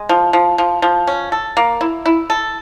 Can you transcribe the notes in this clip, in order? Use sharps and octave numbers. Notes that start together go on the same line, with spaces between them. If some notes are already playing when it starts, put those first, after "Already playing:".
Already playing: G#3
F3
F3
F3
F3
C#4
A4
A#3
E4
E4
A4